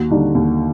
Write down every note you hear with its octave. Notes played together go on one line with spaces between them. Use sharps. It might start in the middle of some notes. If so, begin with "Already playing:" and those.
Already playing: D#2 F#4
D3 G3 D#4
D#2